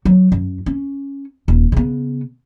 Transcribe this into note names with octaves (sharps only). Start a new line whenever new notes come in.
F#3
F#2
C#4
D#1
C#3 B3